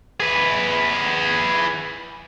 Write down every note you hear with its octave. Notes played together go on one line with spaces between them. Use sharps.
G#4 B4